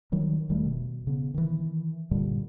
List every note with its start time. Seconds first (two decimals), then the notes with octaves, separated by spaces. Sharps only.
0.12 D#3 F#3 G3
0.49 E1 D#3 G3 A3
0.66 B2
1.07 C#3 B3
1.34 D#3 E3
2.11 G2 A#2 D3 G3